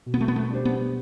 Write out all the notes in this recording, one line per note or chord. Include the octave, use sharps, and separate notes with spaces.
B2
B3
A3
B3
A3
G3 D4 G4 C5
B3